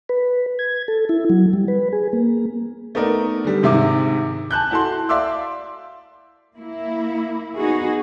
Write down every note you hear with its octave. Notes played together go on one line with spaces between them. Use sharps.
B4
G#6
A4
E4
F#3
G3
B4
G#4
A#3
A3 B3 D#4 A#4 D5
D3 G3
G#2 C3 D#3 E5 D6
G#5 A5 F#6 G6
E4 F#4 A4 A5 C6
D5 E5 F5 C6 D6 E6
A#3 E4
B3 D#4 F#4 G#4